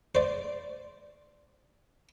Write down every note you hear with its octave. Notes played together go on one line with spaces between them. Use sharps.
C5 D5